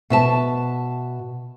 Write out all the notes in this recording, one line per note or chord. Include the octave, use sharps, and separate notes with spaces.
B2 E5 A5